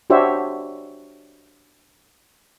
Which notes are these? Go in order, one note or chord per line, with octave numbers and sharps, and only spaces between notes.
D4 F#4 G4 C5 C#5 E5